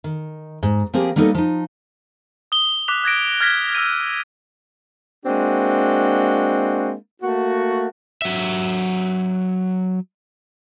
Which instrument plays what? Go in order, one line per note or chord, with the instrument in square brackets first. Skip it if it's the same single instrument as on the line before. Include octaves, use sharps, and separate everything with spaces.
[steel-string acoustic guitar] D#3
G#2
F3 A#3 C4 G4 G#4
G3 A#3 B3 D#4 F4 A4
F3 D#4
[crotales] D#6 G7
D6 F#6 B6 F7
F#6 G#6 A#6 D7
F6 G#6 A#6 B6 D7 G7
E6 G#6 D#7
[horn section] G#3 A#3 C4 D4 F#4
A3 A#3 F#4
[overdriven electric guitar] F#3 E5